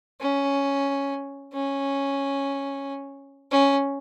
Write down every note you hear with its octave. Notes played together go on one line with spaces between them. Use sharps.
C#4
C#4
C#4